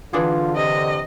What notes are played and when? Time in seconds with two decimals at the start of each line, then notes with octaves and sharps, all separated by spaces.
0.13 D3 E3 D4 F4 G#4
0.56 C3 D#5